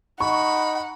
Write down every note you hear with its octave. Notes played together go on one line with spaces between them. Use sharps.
D#4 F#5 B5 C#6